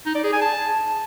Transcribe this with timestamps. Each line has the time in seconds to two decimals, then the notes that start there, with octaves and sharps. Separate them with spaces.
0.06 D#4
0.15 D5
0.24 G#4
0.32 G#5
0.41 A5